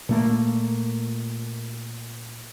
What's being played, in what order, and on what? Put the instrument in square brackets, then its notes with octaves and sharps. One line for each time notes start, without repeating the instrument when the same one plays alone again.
[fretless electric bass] A#2 A3 A#3